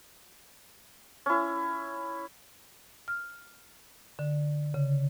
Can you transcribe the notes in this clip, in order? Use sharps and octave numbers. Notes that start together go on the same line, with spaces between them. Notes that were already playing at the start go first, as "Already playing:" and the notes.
C#4 E4
F6
D3
C#3